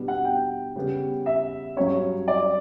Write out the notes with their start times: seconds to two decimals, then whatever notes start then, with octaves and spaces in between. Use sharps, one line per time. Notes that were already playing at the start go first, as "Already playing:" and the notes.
Already playing: B2 G3 B3 D4
0.08 F#5
0.25 G5
0.76 C#3 G3 B3
1.26 E5
1.76 G2 F#3 C#4 C#5
2.28 D5